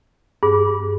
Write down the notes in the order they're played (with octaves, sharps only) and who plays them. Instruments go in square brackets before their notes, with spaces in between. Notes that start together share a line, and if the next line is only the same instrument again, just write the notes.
[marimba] G2 [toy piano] G#4